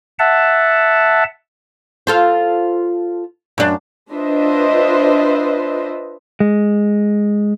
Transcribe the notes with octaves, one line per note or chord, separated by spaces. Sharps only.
E5 F#5 A5
F4 A4 C5
F#2 D4
D4 F4 B4 C5 D#5 E5
G#3